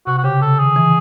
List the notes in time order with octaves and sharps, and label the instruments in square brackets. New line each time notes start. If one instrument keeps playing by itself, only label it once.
[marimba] C3 [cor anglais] F#4
[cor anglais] F#4
[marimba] C#3 [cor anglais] G4
[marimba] C#3 [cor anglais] A4
[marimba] D#3 [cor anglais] G#4
[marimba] E3